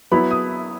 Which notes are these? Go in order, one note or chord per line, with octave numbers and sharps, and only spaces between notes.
F#3 B3 E4 B5
D#6